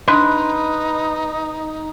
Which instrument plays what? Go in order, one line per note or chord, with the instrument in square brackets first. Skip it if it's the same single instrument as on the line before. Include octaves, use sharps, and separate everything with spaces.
[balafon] D4 C6 [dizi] D#4 [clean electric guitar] B4